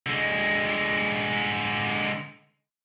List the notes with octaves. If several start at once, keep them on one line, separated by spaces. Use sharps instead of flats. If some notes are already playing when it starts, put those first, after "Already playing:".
D3 G#3